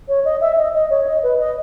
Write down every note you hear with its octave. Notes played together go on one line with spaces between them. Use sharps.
C#5
D#5
E5
D#5
D#5
C#5
D#5
B4
D#5